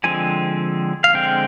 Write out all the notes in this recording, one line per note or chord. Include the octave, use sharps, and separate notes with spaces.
D3 F3 G#3 C4 G#5
F5
D3 G#3 C4 G5